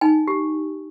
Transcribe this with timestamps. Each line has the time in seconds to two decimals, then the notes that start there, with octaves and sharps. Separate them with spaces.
0.01 D#4 G#5
0.28 G4